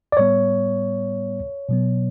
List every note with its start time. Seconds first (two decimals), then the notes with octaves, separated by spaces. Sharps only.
0.12 D5
0.17 A2 G3 B3 C#5
1.69 B2 F#3 B3